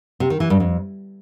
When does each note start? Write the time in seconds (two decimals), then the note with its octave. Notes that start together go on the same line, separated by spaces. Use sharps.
0.20 C3
0.30 D#3
0.40 E3
0.50 G2
0.60 F2